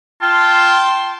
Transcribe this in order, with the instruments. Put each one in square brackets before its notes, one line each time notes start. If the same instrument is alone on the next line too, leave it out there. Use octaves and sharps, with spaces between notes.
[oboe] F4 [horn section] G5 A5 C6